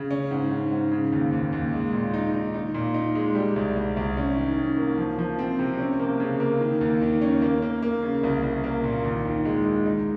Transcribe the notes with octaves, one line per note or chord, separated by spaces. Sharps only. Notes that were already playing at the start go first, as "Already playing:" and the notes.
Already playing: C#3
C#4
G#2
G#2
G#2
C#3
D#2
D#2
D#2
G#3
A#2
D#4
D#4
D#4
A#2
D#4
G#3
G3
C2
C2
C2
C#4
D#3
C#4
A#3
F3
F3
C4
C3
C#4
A#3
C#3
A#3
D#3
D#2
D#3
C#4
A#3
A#3
A#3
C#3
C2
C2
A#3
A#2
D#2
D#3
G#3
G#3
D#4